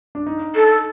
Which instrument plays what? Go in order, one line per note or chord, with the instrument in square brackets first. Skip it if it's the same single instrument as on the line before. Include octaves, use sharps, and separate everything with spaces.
[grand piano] D4
D#4
[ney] A4